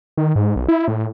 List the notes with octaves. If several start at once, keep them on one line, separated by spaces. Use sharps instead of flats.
D#3
G#2
B1
E4
A2